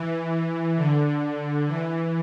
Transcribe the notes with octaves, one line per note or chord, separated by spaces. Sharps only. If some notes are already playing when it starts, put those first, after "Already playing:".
Already playing: E3
D3
E3